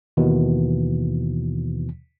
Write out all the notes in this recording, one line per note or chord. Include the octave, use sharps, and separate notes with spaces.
D#2 B2 D#3 E3